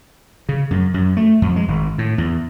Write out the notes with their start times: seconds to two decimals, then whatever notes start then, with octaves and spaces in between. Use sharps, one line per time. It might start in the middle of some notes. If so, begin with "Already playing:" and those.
0.49 C#3
0.71 F#2
0.94 F#2
1.17 A3
1.42 F2
1.56 G#3
1.68 G#1
1.98 A2
2.18 E2